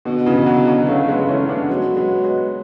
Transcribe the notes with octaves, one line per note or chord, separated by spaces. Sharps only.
B2 D3
C#3 E3
E3
D3 F#3
D3 F#3
C#3 F#3 A3
G#3 B3
C#3
E3 A3 C#4
D3
B3 D4
F#3 G#3 B3
G#3 B3
G#3 B3